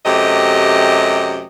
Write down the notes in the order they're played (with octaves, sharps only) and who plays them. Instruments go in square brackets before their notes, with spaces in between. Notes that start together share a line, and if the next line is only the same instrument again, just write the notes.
[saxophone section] F#2 C3 A3 G4 D#5